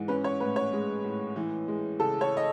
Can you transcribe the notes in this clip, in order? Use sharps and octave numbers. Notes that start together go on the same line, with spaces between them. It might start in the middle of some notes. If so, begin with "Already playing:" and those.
Already playing: G#2 E3
C#4 B4
C#5
A2 B4
C#5
G#3
A2
E3
G#3
C#3 A4
C#5
D#5